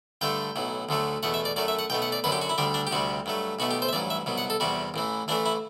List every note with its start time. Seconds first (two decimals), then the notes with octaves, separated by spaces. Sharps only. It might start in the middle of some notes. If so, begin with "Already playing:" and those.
0.21 G2 D3 A3 G5
0.56 B1 A2 F#3
0.89 D2 D3 F#3 A3
1.23 E2 B2 A3 F#5
1.34 E5
1.45 D5
1.56 F#2 F#3 A3 D5
1.68 E5
1.79 F#5
1.90 B1 B2 A3 G5
2.02 F#5
2.12 D5
2.24 F#2 D3 F#3 B4
2.32 G4
2.42 F#4
2.49 E4
2.58 D2 D3 G3 D4
2.74 D4
2.87 G4
2.91 D2 C3 G3 F#4
3.26 G2 F#3 A3
3.59 B1 B2 A3 F#4
3.71 G4
3.82 C5
3.89 E5
3.93 A1 G2 F#3 D5
4.10 E5
4.26 C2 B2 F#3
4.38 F#5
4.50 A4
4.60 E2 C3 G3 F#4
4.94 A1 A2 E3
5.28 A1 A2 E3 A3 D4
5.46 E4